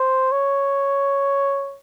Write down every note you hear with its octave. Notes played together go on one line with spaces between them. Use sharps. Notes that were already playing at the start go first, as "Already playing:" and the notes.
Already playing: C5
C#5